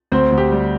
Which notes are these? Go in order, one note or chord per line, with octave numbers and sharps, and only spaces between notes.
D2 C4 C5
D2
G4
G3